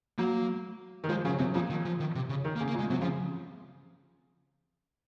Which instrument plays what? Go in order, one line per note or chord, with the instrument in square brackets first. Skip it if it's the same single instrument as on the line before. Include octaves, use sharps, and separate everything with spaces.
[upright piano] F#3 [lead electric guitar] A#3
[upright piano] D#3
[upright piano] F3 [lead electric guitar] G#3
[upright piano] C#3 [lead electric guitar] F#3
[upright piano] C3 [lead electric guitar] F#3
[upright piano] A#2 [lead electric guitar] F3
[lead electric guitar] D#3
F3
D#3
C3
C#3
[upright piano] D#3
[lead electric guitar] A#3
[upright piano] C#3
[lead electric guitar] A#3
[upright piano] A#2
[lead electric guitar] G#3
[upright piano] C3 [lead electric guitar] F#3
[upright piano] C#3 [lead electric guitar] F3